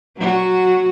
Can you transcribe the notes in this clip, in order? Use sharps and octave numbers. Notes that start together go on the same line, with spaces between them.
F#3 F#4